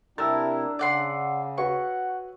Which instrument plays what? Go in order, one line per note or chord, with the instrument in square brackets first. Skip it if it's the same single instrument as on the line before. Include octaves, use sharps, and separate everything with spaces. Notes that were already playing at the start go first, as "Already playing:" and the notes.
[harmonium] C3 E4 G4 [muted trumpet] D4 [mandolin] A#4 [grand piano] A5 E6 A6
[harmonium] C#3 [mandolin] D5 F#5 C6
[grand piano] F#4 B4 C#5 [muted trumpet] F#5 [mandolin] C#6